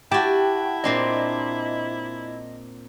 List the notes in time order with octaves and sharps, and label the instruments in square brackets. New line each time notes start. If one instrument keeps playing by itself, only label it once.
[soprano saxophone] E4 [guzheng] F#4 A5 [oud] G4 [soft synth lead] G5
[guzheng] A#2 C4 D4 [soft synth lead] D#5